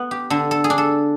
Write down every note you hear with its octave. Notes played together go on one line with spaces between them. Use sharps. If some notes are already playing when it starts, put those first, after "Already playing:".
Already playing: B3
G4
D3 A4
A4
G#4
D4
A4